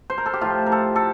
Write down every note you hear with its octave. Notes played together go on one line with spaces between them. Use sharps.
C5
A#4
A4
G4
A2 F3 F4
A#4
A4
A4